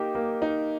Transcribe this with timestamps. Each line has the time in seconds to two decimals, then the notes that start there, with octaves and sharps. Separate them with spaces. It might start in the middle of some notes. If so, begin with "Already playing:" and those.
Already playing: A#3 D#4 G4
0.15 A#3
0.42 D#4